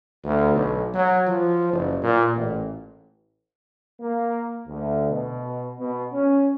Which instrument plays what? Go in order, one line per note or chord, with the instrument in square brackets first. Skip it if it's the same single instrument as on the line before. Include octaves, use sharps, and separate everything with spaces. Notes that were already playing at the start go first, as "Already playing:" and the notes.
[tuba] D2
B1
F#3
F3
F#1
A#2
A1
[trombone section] A#3
D2
B2
B2
C#4